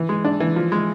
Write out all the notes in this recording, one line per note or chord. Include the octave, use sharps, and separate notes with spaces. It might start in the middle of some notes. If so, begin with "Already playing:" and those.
Already playing: E3
G#3
D4
E3
F3
G#3